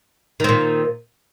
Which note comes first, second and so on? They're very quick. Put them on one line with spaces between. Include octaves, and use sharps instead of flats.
D#3 C4 A#2